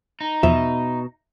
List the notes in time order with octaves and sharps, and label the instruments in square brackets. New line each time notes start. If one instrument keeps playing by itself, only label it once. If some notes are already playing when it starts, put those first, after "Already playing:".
[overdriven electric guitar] D#4
[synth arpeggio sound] E2 F3 [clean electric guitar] B2 [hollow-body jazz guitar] E5